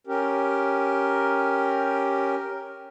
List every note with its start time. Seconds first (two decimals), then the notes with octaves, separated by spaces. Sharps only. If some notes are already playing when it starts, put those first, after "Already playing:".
0.07 C#4 G4 A#4